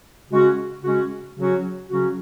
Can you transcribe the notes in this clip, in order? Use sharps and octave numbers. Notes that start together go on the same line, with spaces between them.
C#3 G#3 C#4 F#4
C#3 G#3 C#4 F#4
C#3 F#3 C#4 F#4
C#3 F#3 C#4 F#4